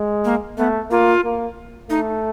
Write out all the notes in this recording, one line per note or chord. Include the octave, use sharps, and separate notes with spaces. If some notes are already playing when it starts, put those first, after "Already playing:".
Already playing: G#3
A#3
A3 B3
A#3 F4
A#3
A3 D#4